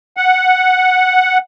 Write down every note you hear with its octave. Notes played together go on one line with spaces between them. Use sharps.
F#5